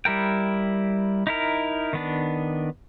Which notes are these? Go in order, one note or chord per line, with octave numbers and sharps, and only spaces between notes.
G3 E4 A#4 G5
D#4 E4 A#4
D#3 B3 D4